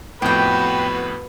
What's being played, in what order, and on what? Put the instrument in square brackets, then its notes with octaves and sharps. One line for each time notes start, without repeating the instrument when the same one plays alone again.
[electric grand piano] F2 A2 [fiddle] B3 F#4 [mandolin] G4 G5 [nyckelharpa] B4